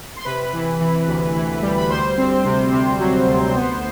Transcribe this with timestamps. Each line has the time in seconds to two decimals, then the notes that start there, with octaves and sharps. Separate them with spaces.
0.17 C6
0.25 C3 B4 B5
0.53 E3
0.80 E3
1.07 D2
1.35 E3
1.62 G3
1.78 B5
1.90 D2 C5 C6
2.17 C4
2.45 C3
2.72 C3
2.99 F#3
3.28 D2
3.54 B3